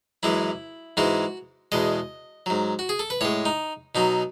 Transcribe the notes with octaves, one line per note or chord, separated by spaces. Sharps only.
F#2 E3 G#3 E4
G#2 E3 G#3 F#4
E2 B2 G#3 D#5
G#2 F#3
F#4
G#4
A4
B4
A2 G#3 C#5
D#4
B2 F#3 D#4